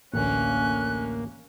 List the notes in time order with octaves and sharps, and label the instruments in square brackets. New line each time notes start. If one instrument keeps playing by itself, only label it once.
[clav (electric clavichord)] A1 D2 [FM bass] A#3 [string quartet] C#4 [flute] F#6